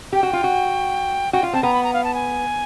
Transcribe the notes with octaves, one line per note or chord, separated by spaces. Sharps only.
G4 G5
F#4
F4
F#4
F#4 G5
F4
C4 A5
B3 A#5
B5
A#5
F5
A5
G#5